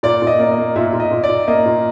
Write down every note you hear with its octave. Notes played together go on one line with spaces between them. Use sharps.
A#2 D5
A#2
D#5
A#3 D5
D#5
A#3
A#2 E5
A#2
D#5
A#2
D5
A#2
A#3 D#5
A#2